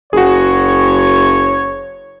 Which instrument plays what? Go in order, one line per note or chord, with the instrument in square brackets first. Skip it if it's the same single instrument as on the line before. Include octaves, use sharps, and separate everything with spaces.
[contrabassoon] F#1 [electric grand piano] F#4 G#4 [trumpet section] C#5